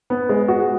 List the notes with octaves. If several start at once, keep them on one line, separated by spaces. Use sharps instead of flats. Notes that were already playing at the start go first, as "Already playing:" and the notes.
B3
G#3
F#4